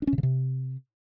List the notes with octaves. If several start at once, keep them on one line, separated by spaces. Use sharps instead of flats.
D4
C#4
C3
C#3
C3